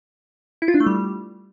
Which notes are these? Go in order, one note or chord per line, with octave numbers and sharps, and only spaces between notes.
E4
F4
D4
A3
G3